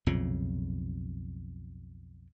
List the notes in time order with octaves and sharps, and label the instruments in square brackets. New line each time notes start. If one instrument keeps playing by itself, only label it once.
[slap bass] B1 F2 A#2 C#3